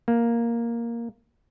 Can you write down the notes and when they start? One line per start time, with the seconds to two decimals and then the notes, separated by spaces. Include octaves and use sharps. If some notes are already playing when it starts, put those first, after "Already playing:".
0.08 A#3